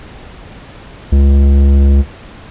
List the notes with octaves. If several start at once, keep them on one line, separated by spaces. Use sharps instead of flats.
C#2